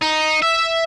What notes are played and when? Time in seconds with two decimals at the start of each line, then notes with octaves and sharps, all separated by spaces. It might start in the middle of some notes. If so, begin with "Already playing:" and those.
0.02 D#4
0.42 E5